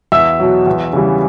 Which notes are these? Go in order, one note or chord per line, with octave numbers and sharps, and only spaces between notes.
E2 E5 E6
B2 F#3
E2
C#3 E3 G3